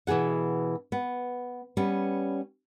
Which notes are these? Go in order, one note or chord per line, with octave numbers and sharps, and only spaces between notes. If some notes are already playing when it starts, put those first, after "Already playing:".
B2 E3 B3 G#4 F#5
B3
G3 B3 C#4